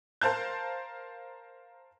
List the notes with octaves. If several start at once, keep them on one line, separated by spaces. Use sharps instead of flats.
A#4 C5 F5 A5 G6